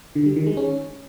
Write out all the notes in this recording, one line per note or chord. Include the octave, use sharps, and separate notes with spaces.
D3
G3
D#3
G#3
C#4